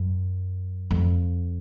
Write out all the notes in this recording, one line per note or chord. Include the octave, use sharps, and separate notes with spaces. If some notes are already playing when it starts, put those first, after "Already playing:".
Already playing: F#2
F2